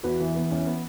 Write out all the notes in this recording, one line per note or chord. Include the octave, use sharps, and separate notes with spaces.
E2 F#4 B4
E3
E3 B3
E2 C#4
B3